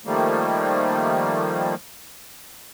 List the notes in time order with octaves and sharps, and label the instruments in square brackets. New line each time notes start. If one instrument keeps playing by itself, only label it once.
[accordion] D#3 F3 G3 A3 A#3